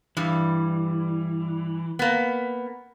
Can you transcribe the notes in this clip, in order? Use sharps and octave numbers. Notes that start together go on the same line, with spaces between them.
G2 E3 G3
A#3 B3